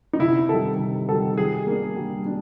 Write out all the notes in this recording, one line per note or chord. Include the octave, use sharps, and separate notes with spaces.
D#4
C3 E4
D#3 G3 A4
C3
D#3 G3 A4
G3 G#4
A#3 D4
G3
D4